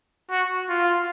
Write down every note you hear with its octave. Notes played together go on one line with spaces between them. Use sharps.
F#4
F4